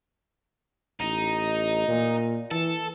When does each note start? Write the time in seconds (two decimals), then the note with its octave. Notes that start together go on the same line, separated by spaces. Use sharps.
1.01 A1 D#4
1.88 A#2
2.51 E3 A4